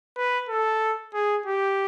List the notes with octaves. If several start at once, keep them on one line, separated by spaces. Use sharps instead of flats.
B4
A4
G#4
G4